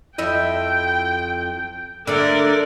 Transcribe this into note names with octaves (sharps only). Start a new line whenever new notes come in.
F2 E4 D#5 G5
D3 A3 A#3 A#4 D5